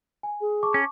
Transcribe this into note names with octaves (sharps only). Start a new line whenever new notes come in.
G#5
G#4
A5 C#6 D6
C#4